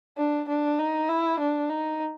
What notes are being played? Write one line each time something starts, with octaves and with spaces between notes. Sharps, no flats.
D4
D4
D#4
E4
D4
D#4